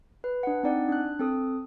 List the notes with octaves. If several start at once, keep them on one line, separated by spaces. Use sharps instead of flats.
B4
D4 F#5
C4 D#4 D5 F#5 G#5
D4 F#6
C4 A4 D#6